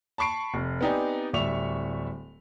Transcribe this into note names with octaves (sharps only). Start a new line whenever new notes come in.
A5 B5 C#6 C7 D7
F1
B3 C4 D#4 G4 D5 G#5
D1 G3 E5 C#6 F7